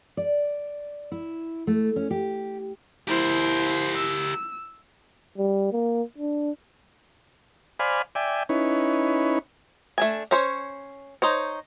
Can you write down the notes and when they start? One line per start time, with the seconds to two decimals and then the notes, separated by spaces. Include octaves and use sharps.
0.17 D5
1.12 E4
1.67 A3
1.96 C#4
2.11 G4
3.07 E4 G4 A#4 C5
3.97 E6
5.38 G3
5.72 A#3
6.18 D4
7.79 C5 D5 F5 G#5 B5
8.15 D5 E5 G5 G#5
8.49 C#4 D#4 E4 B4 C#5
9.98 A3 D4 G#5
10.31 C#4 C5 C#5
11.22 D#4 C5 C#5